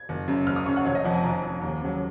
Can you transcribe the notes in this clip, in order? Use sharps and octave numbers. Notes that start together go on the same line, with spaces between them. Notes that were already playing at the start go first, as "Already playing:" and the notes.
Already playing: G#6
F#1
F#2 C#3
F#1 F6
D#6
F#2 C#3 C#6
F#5
F1 C#5
D#5
F2 F3 F#5
G#5
F1 A#5
F2 F3
D#2
C#3 F#3